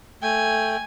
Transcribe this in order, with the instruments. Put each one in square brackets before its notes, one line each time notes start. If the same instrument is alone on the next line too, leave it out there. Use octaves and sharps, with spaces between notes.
[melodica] A3 G5 [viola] G#5